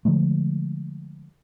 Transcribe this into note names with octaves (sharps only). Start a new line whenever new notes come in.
D3 F3 G#3 A3